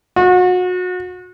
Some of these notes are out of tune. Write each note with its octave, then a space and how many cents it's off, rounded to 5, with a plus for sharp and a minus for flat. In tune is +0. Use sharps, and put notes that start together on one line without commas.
F#4 -30